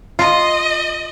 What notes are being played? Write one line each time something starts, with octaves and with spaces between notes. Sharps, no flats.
F4 D#5